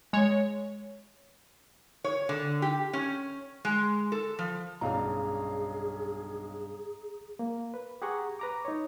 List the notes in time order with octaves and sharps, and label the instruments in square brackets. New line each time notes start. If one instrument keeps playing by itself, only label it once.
[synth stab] G#3 C#5
[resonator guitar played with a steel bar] C#5
D3
G4
C#4
G#3
A4
F3
[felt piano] B1 F5 [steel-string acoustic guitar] G2 C#3 [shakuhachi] G#4 [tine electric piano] A#5
[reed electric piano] A#3
B4
G4 G#4 F#5 A#5 C#6
B4 A#5 D6
D#4 C#5